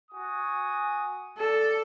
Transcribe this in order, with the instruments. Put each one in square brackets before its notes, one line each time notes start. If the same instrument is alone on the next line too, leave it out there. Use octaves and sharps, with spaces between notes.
[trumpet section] F#4 G#5 D#6
[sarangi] A4 [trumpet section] D5 A5